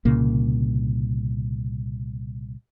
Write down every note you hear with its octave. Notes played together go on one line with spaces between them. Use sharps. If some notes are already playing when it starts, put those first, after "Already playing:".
C2 A#2 C#3 A#3